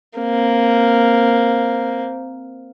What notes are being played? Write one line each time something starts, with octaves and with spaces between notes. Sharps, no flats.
A#3 C4